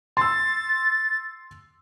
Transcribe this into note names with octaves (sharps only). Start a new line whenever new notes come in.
C6 E6 A6